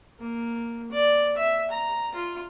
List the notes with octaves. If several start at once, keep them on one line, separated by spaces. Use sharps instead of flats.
A#3
D5
E5
A#5
F4